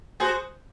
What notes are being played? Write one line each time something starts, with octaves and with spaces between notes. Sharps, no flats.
F#4 G#4 C5